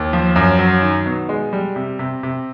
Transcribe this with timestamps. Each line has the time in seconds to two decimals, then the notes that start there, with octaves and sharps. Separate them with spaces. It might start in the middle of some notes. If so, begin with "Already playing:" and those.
Already playing: D#2
0.13 F3
0.36 F#2
0.59 F#3
0.82 D#3
1.06 B2
1.29 G#3
1.53 G3
1.76 C3
1.99 C3
2.23 C3